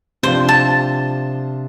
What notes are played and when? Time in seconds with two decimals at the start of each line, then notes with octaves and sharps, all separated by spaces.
0.23 C3 F3 D4 F4 C5
0.49 A5